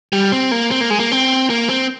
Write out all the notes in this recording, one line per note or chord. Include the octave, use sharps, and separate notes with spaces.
G3
C4
A#3
C4
A#3
G#3
A#3
C4
A#3
C4